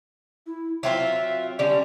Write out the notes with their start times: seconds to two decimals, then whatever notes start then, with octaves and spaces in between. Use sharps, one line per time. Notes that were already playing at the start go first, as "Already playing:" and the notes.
0.46 E4
0.83 F#3 C4 F4 E5
1.59 D3 G3 C#4